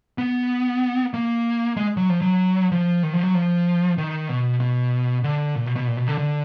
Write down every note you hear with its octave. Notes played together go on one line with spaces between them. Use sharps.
B3
A#3
G#3
F#3
F3
F#3
F3
D#3
F3
F#3
F3
D#3
B2
B2
D3
A#2
B2
B2
A#2
B2
D3
D3